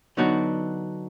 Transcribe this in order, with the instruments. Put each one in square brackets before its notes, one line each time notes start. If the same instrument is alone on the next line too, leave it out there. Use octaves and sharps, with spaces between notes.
[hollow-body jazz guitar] D3 F#3 B3 D4 D#4 F#4